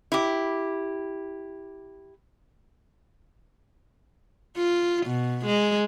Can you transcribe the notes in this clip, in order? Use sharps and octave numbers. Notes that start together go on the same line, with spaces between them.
E4 G4
F4
B2
G#3